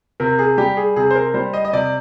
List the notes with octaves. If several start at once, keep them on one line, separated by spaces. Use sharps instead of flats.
C3 A#4
G#4
G3 G4
G#4
C3 G#4
C5
A#4
G3 C5
D#5
D#5
C3 D5